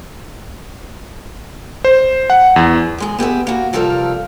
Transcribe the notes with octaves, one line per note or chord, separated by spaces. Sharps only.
C5
F#5
E2
F#2 G#3 G#4
B3 G4 G#4 E5
A#3 F#4
C3 F3 G3 A4 A#4 F5